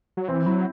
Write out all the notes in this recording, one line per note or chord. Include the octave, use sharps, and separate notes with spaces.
F#3
E3 C4
F#3 E4